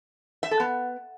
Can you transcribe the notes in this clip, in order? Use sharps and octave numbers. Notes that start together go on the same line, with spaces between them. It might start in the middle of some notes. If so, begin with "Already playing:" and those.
E5
A4
B3